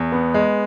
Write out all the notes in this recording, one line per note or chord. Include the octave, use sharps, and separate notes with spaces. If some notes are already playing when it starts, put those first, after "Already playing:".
Already playing: E2
B3
G#3